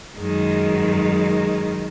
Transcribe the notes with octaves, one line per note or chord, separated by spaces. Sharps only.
F#2 D#3 G#3